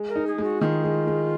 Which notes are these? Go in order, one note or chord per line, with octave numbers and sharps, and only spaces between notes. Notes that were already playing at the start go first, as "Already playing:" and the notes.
Already playing: G#3
A#4
D#4
G#4
G#3
F#4
D#3 F4
G#3
G#3